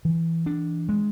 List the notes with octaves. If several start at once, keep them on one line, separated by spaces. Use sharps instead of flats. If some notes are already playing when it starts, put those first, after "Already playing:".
E3
D4
G#3